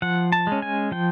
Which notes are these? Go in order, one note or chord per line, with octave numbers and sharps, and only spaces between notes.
F3 F#5
A5
G#3 C#4
G#5
F3 G5